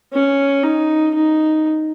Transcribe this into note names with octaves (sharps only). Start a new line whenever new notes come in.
C#4
D#4
D#4